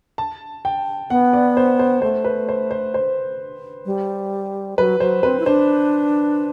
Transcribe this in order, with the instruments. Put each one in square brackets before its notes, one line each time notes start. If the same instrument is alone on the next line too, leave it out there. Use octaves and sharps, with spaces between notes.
[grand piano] A5
G5
[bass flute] B3 [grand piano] F#5
[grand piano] D5
C5
C5
[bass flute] A3 [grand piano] C5
[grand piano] B4
C5
C5
C5
[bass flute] G3
[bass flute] F#3 [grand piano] B4
[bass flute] F#3 [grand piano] C5
[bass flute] C4 [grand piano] B4
[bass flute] E4
[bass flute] D4 [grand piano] C5